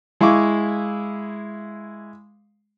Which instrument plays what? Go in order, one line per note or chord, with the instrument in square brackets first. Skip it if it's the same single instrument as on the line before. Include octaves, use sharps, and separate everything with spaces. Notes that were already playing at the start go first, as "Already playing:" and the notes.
[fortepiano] G#3 E4 F5 C#6 D6